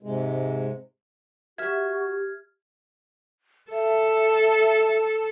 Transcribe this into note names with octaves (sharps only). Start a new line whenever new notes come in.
G#2 C3 G#3
F#4 G4 E5 F6 G#6
A4 E5